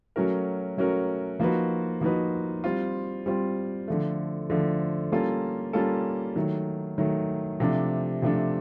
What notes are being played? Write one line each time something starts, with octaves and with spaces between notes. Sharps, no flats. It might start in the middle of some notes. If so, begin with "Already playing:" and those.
F#3 A3 C#4 F#4 A#4
F#3 A3 C#4 F#4 A#4
F3 A#3 D#4 F#4 B4
F3 A#3 D#4 F#4 B4
G3 C4 F4
G3 C4 F4
D3 F3 A3
D3 F3 A3
G3 A#3 C#4 F4 A4
G3 A#3 C#4 F4 A4
D#3 F#3 A3
D#3 F#3 A3
C3 F3 A3 D4
C3 F3 A3 D4